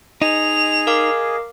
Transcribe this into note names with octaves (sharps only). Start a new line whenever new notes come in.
D#4 G#4 D#5 F7
A#4 F5 D6